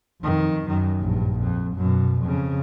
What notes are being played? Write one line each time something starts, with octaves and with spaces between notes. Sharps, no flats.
F2 D#3
F#2 D#3
A#1 G2
F2
F#2 B2
F2 C#3